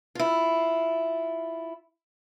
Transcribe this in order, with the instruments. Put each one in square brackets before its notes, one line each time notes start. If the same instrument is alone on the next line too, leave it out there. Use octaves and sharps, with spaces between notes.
[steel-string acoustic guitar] E4 F4